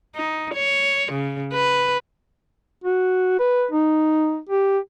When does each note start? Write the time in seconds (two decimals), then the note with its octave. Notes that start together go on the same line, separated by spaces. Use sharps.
0.16 D#4
0.54 C#5
1.12 C#3
1.53 B4
2.84 F#4
3.40 B4
3.71 D#4
4.49 G4